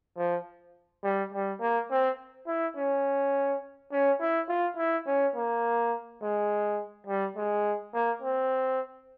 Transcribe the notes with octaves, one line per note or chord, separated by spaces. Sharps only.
F3
G3
G3
A#3
C4
E4
C#4
C#4
E4
F4
E4
C#4
A#3
G#3
G3
G#3
A#3
C4